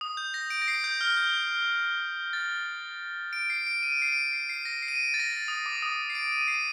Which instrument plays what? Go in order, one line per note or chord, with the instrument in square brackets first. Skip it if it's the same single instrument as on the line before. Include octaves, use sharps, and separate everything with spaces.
[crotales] D#6
G6
A#6
D7
A#6
C7
G6
F6
G6
A6
D7
C7
D7
D#7
D7
C7
D7
C7
C7
A#6
C7
D#7
D7
A6
A#6
A6
D#6
D6
D#6
C7
D7
D#7
C7